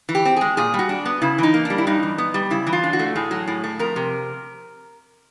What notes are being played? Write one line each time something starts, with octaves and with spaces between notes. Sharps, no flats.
E3
G4
C4
G#3 G#4
A#2 G#4
G3
F#4
D4
B3
C#3 E4
E3 D#4
A#3
G3 D4
E4
G2 D#4
E3
B3
G3
C#3 E4
E3
F4
D4
F#4
A3
A2 G#4
F#3
A2
A3
F2 A#4
C3